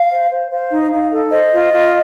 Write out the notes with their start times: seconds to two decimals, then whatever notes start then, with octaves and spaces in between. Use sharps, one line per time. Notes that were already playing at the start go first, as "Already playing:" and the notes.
Already playing: F5
0.11 C5
0.30 C5
0.51 C5 F5
0.71 D#4
0.92 D#4
1.12 A4
1.31 C5 D#5
1.52 F4
1.72 F4